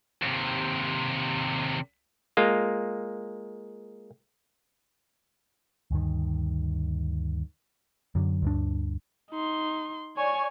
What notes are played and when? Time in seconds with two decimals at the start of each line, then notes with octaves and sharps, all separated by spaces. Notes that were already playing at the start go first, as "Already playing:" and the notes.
0.22 D#2 C3
2.37 G#3 A#3 F4
5.91 D2 G2 D#3
8.15 F#2 D3 F#3
8.42 D2 G2 D4
9.31 D#4 C6
10.17 C#5 D5 G#5 C#6